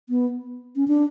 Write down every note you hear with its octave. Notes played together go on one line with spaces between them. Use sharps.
B3
C#4
D4